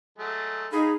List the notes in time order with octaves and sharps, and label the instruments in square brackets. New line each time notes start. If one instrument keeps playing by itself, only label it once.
[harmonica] F#3 G#3 A3
[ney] D#4 [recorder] G#4 [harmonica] F5 B5